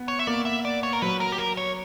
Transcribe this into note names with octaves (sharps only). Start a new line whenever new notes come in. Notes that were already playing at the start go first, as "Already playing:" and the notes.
Already playing: B3
C#5
E5
A#3 D5
E5
D5
C#5
A#4
F#3 B4
A#4
G4
A#4
C#5